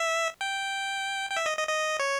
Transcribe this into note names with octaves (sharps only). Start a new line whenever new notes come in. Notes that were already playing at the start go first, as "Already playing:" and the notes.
Already playing: E5
G5
G5
E5
D#5
D#5
D#5
C#5